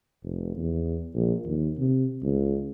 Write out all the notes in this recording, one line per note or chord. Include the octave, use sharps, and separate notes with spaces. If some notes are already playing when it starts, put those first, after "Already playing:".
F1
E2
A#1
D#2
C3
C#2